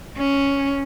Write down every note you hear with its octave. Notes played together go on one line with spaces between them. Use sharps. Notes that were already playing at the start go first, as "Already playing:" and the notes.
C#4